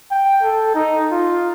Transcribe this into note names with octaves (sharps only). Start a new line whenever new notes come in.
G5
A4
D#4
F4